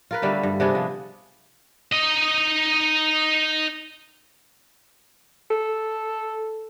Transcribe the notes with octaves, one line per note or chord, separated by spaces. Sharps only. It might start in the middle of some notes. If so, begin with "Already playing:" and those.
F4 A#4 B4
D3 G3 A3 B3
G2
C3 B3 D4 G#4
F3
D#4 D#5
A4